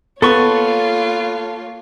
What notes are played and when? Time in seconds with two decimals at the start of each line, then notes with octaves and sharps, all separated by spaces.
0.22 A#3 B3 F4 A4 C#5 C#6